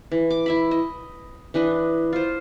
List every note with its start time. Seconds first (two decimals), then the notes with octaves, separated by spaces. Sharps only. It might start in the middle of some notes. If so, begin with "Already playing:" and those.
0.12 E3
0.31 D6
0.46 E4 E5 B5
0.71 D#5
1.54 E3 D4 B4 D#5
2.13 F4 C5